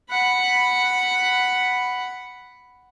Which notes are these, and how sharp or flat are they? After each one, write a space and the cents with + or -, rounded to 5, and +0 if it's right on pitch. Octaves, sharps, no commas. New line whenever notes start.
F#5 +0 B5 +0